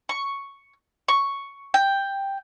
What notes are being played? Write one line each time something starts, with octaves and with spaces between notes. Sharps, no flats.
C#6
C#6
G5